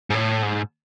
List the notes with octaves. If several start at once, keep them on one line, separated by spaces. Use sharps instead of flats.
G#2
A2
G#2